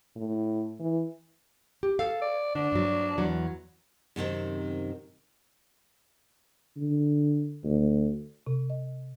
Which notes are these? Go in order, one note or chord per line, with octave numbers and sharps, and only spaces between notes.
A2
E3
G4
A4 F5
D5
D3 D4
G2 F#3
E2 F#3
F#2 C3 D#3 C4
D3
D2
C3
D#5